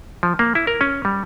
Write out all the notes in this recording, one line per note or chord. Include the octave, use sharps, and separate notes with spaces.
F3
A#3
E4
A#4
C#4
G3